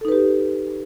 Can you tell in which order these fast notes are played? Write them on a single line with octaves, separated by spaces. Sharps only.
A4 D#4 B4 G4